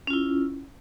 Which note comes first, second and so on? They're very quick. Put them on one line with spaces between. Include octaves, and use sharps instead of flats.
C#4 F4 E4